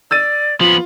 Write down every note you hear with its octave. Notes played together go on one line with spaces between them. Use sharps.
D5 E6 A6 D#7
F3 B3 F4 F#7